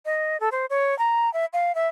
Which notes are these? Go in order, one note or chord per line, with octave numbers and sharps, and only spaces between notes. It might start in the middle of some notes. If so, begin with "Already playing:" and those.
D#5
A4
C5
C#5
A#5
E5
F5
E5